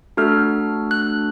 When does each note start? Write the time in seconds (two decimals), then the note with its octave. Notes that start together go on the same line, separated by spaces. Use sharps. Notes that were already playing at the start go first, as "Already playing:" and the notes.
0.17 A3 D4 F#4 A4 F6
0.91 F#6